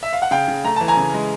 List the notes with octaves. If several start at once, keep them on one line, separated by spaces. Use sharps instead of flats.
E5
F5
F#5
C#3 F5 G5
C#3
A3 A#5
E3 A5
G#5 A#5
C#3
G#3